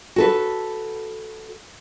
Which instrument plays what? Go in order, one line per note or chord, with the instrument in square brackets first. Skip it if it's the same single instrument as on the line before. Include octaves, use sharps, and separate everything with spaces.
[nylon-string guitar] F#4 A4 B4